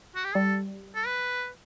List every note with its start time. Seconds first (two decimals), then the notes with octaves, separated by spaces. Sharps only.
0.16 F#4
0.25 G4
0.35 G3 A4
0.95 A4
1.06 B4